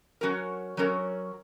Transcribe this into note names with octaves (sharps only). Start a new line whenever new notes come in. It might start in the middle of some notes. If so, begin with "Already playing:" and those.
F#3 C#4 F#4 A#4
F#3 C#4 F#4 A#4